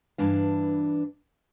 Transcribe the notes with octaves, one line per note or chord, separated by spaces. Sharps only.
G2 E3 D4 F5